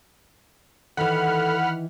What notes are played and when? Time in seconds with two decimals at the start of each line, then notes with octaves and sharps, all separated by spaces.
0.97 D#3 E3 A4 F#5 B5 F6